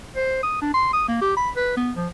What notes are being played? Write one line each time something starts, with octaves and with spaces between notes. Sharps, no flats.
C5
D#6
D4
C6
D#6
A#3
G4
B5
B4
B3
F3